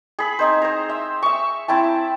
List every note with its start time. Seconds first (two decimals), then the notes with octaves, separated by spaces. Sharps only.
0.19 G#4 B5
0.39 C4 D#4 C5
0.62 C5 A#5
0.89 E5
1.22 E5 C#6
1.68 C4 E4 G5 A5